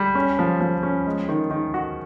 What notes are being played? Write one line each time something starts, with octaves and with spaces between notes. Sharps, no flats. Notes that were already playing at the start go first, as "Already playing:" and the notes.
Already playing: G3
C#4
F3
F3
C#4
G#3
D#3
D#3
F#4